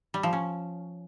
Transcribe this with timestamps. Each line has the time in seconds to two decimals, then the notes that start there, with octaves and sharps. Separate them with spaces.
0.14 G3
0.23 F3
0.33 C#4